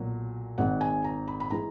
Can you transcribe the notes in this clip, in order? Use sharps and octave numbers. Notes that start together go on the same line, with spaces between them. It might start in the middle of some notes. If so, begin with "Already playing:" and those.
Already playing: B1 A#2 F#3
G#1 G#2 D#3 F#5
G#5
A#5
B5
B5
E3 G#3 A#5